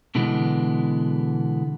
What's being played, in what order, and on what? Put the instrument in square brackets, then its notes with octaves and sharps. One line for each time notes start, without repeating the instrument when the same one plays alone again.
[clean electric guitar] B2 D3 E3 G#3 B3